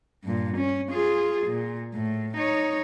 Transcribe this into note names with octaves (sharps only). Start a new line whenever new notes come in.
G2 A#2
C#4
F4 G#4
A#2
A2
D#4 C#5